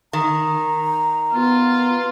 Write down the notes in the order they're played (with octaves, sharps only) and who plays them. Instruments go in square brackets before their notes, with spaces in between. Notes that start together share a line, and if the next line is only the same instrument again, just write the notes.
[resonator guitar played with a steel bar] D#3 [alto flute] A#5
[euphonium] B3 [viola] F4